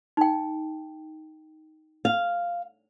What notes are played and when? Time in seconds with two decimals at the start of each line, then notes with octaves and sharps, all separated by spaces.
0.17 D#4 G5
2.05 F5